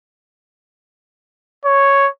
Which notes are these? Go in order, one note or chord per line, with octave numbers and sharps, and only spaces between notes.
C#5